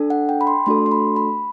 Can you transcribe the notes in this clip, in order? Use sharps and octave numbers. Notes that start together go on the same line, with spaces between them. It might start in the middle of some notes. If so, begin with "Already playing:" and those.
Already playing: D4 A4
F#5
G5
B5
C6
A3 D4 F#4 A4 C6
C6
B5
B5